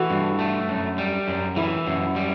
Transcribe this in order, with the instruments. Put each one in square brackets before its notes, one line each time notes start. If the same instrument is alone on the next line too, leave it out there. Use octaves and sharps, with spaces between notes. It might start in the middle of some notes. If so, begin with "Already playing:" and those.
Already playing: [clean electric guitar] E3 [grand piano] F#4 A4
[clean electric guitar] G2
A3
F#2
G3
F#2
[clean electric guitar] E3 [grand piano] E4
[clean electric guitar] F#2
G3